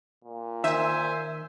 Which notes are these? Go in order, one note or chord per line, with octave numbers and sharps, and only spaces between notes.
A#2
D#3 C5 E5 G#5